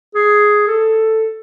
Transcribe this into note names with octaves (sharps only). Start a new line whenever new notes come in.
G#4
A4